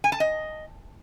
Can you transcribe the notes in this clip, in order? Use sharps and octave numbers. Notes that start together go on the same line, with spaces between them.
G#5
A5
D#5